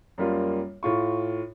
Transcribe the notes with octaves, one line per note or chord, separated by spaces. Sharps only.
F#2 G3 A#3 F4
A2 F4 C#6